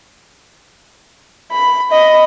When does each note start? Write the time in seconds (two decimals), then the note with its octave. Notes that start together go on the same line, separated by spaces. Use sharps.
1.52 B5
1.92 D#5 B5